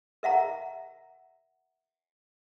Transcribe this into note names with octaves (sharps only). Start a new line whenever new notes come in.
A#4 E5 F#5 A#5